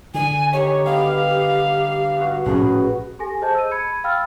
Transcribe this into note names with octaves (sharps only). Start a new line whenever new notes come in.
D3 G#5
D#3 G4 C#5 A#5
G3 B3 F5 G5
G2 F#4
A#1 A2 C#4 F#4 G#4 B4
G4 A4 G#5 A#6
G#4 C5 D#5 A5 G6
E6 D#7
B5 G#6 C#7 D#7
F5 G5 B5 E6 F6 A6